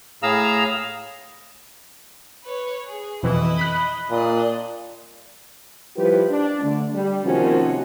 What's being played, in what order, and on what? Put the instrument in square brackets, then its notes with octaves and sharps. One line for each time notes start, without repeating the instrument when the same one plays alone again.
[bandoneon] A2 G#4 F5 A#5 E6
[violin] B4 C#5
G#4
[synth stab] F2 B2 E3 [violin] E4 D#5
[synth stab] B5 F#6
[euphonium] A#2 [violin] D4 D#5
[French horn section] F3 G3 E4 G4 B4
D4
D3 A3
G3
C3 D#3 F3 A#3 C#4 F#4